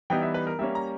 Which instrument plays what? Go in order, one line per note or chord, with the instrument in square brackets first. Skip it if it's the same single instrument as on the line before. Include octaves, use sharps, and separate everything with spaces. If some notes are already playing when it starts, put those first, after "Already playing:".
[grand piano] E3 G3 B3 D#4 G5
E5
B4
A#4
G3 A#3 C#4 E5
A#5